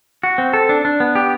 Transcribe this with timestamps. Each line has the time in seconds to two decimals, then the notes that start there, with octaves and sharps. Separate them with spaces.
0.23 F#4
0.38 C4
0.53 A4
0.69 D4
0.85 D4
1.00 B3
1.15 G4